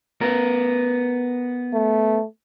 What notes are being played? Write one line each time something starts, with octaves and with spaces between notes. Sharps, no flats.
B3 A#4
A3